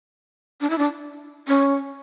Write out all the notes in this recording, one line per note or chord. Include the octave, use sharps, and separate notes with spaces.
D4
E4
D4
C#4